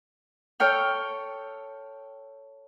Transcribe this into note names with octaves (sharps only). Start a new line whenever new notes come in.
A4 C#5 G5 F6